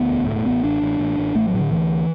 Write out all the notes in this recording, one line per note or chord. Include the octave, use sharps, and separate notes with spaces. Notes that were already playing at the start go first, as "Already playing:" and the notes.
Already playing: D2 B3
E1
A2 A3
A1 B3
A1 D4
A1
A1
A1
A1 A3
F#3
A2
D3
D2 E3